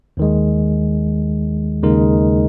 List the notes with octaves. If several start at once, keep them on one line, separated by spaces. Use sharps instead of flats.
D#2 D#3 G#3
D#2 C#3 G#3 D#4 A#4